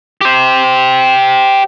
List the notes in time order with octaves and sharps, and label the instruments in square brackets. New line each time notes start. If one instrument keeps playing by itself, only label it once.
[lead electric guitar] G4 C5